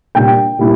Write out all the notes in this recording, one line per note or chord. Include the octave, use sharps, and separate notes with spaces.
A#2 G3 D4 G5
A#2 G3 A#3 E4